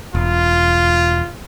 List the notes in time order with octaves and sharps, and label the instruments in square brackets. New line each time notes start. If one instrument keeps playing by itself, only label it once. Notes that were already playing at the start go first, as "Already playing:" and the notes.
[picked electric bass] E1 [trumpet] F4